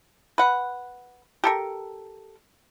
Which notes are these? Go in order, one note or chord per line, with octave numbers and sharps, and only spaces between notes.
B4 F#5
G4 A4 A#4